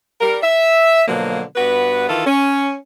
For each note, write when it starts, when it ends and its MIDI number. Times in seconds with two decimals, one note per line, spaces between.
0.20 0.38 55
0.20 0.38 70
0.43 1.03 76
1.08 1.43 47
1.08 1.43 50
1.08 1.43 53
1.08 1.43 54
1.08 1.43 58
1.56 2.07 43
1.56 2.07 59
1.56 2.07 66
1.56 2.07 71
2.08 2.23 51
2.08 2.23 52
2.08 2.23 65
2.08 2.23 69
2.26 2.74 61